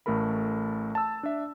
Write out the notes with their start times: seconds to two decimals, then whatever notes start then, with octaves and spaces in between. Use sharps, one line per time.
0.06 A1 A3 A4 A#4 B5
0.95 A5 E6
1.23 D4 E5